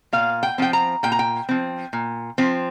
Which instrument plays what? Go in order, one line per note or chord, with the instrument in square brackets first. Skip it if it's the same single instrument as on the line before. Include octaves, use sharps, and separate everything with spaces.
[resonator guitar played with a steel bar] A#2 F5
G5
F3 C4 G5
A#5
A#2 G5
A#5
G5
F3 C4
A#2
F3 C4